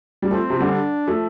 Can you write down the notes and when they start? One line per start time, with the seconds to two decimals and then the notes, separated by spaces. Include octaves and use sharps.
0.22 G3
0.31 F3 A3 C4
0.50 C3 F3
0.60 D3 G3
0.70 D4
1.07 F3 A3